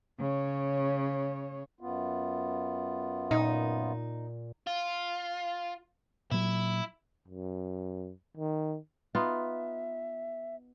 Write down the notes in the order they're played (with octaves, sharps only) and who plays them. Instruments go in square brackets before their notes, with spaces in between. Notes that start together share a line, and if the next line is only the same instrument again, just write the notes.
[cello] C#3 C#5
[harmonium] F#2 B3 F4
[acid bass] A#2 [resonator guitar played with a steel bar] D#4
[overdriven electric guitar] F4
[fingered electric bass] A#2 F#3 [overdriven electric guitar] E4
[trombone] F#2
D#3
[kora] B3 D#4 F4 [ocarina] E5